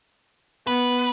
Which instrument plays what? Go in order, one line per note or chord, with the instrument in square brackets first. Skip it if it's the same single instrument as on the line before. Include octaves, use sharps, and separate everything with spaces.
[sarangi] B3 [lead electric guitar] B4